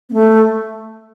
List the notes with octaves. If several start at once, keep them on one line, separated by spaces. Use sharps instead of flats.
B3
A3